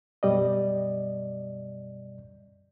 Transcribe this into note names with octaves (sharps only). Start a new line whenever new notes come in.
F#2 B2 G3 D5 D#5